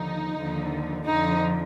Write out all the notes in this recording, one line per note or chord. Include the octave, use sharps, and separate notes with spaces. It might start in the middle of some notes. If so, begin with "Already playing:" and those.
Already playing: D#2 D3 F3 D#4
D#2 D3 F3
F2 D3 F3 D#4